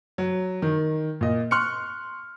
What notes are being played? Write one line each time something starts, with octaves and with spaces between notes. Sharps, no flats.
F#3
D#3
A#2 D#5
C6 C#6 F6 F#6 C#7